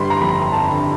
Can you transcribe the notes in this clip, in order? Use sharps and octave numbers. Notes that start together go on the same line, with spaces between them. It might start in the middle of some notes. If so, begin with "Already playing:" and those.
Already playing: G1 G3 B5 C6
A#5
F2 B5
A5
D3